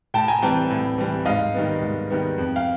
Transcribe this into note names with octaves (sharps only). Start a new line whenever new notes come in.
A2 G5 A5
G#5 A#5
E3 G3 C4 G5 A5
A2
E3 G3 C4
G#2 D#5 F5
D#3 G3 B3
G#2
D#3 G3 B3
F2
F5 G5